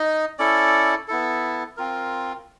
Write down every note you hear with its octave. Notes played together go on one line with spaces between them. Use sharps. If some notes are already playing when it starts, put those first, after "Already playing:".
Already playing: D#4 D#5
C#4 E4 A4 D5
B3 E4 A4
C4 F4 A#4